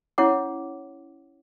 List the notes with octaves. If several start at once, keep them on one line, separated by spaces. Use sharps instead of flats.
C#4 E4 C#5 F#5 D6